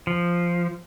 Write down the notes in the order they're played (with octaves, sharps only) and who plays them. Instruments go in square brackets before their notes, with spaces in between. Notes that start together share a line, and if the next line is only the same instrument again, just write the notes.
[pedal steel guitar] F3